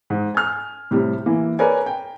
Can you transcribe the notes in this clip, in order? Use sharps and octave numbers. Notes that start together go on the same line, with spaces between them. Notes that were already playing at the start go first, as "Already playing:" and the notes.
G#2
G#5 F6
A2 C3 G3
E3 A#3
A#4 B4 C#5 D5 G#5
G5